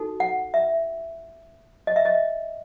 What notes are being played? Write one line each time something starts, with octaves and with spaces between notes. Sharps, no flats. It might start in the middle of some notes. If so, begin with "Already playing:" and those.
Already playing: D#4 F#4 A4
F#5
E5
D#5
E5
D#5